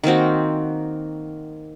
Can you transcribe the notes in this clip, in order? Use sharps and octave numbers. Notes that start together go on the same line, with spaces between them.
D#3 A#3 C4 F#4